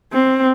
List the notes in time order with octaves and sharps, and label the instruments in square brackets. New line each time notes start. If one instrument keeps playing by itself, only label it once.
[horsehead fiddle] C4